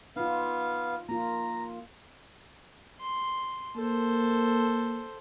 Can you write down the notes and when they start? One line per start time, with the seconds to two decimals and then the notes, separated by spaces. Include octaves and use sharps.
0.16 B3 D#4 F4 F5
1.09 A#3 F4 A#5
3.00 C6
3.76 A#3 A4 C5